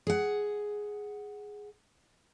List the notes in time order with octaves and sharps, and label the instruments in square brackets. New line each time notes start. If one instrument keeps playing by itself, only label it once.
[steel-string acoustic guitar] G#4 F#5